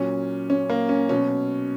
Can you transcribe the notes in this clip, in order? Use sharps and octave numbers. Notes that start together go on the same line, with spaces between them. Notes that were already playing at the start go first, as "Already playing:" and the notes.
Already playing: A#2 F#3 C#4
C#4
A#3
C#4
B2 F#3 C#4